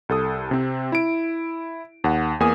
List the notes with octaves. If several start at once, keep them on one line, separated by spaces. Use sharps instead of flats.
C2 A4 D#6
C3 C4
E4 D7
D#2 F#5
E2 A#3 G#5 D#6